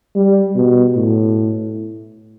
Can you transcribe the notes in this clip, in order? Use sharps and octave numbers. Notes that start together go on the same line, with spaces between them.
G3
B2
A2